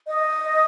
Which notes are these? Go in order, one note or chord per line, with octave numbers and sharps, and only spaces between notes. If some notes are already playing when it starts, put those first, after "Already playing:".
D#5